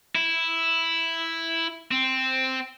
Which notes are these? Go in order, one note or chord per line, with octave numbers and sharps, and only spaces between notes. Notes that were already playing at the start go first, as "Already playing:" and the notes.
E4
C4